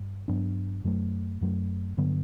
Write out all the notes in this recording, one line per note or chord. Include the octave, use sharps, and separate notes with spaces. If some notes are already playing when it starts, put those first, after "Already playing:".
Already playing: G2
G2 F#3 B3 D4
F#2 F#3 A3
F#2 F#3 A3
G2 D3 F#3 B3